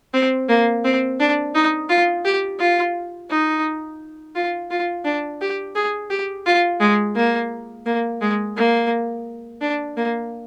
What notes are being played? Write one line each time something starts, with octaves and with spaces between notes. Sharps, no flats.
C4
A#3
C4
D4
D#4
F4
G4
F4
D#4
F4
F4
D4
G4
G#4
G4
F4
G#3
A#3
A#3
G#3
A#3
D4
A#3